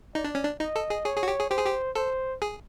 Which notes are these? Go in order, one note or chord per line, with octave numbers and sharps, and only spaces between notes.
D#4 D5
D4
C#4
D4
D#4 D#5
A4
G#4
G#4 C#5
G#4
F#4
G4
G#4
G4 C5
G#4
G4
A4 C5
G#4